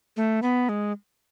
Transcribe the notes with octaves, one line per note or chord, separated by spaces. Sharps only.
A3
B3
G#3